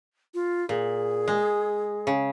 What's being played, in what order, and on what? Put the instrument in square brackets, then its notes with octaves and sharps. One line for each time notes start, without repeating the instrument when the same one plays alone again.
[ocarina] F4
[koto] A#2 [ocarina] G#4
[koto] G#3
C#3